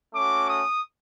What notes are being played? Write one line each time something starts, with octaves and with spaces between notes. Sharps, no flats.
A3 C#4 F#4 D6
D#6